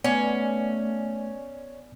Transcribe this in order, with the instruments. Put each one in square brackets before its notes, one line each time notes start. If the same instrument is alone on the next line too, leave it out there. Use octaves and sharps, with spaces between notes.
[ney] A3 [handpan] B3 [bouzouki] C#4 [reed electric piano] D5 G#5